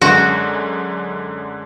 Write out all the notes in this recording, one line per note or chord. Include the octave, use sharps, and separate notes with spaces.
F#2 D3 G#3 F#4